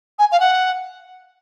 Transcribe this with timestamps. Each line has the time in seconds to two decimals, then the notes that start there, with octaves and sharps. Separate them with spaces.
0.19 G#5
0.31 F5
0.40 F#5